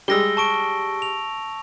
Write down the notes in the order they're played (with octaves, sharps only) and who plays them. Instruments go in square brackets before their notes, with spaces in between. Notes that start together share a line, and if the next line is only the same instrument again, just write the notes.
[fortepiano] G3 G#3 [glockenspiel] E6 A#6 G7
[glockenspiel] A5 C#6 D7
F7